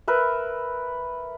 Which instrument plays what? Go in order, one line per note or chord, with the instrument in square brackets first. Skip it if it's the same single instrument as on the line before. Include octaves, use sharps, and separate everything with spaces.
[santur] A#4 B4 E5